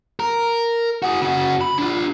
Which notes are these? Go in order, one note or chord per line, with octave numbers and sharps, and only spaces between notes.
A#4
F#4 G#4
C#3 F#4
B5
D4 F4